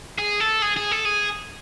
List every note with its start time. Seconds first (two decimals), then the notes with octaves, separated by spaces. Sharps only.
0.19 G#4
0.40 A4
0.62 G#4
0.76 G#4
0.92 A4
1.05 G#4